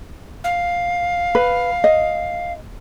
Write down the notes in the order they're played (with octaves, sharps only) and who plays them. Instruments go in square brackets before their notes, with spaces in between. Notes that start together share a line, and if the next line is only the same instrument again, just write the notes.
[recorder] F5
[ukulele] B4
D#5